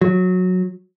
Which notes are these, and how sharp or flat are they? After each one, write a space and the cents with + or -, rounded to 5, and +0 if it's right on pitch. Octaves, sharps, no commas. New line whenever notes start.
F#3 -15